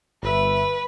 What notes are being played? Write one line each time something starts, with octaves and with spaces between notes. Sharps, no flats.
G1 B4 E5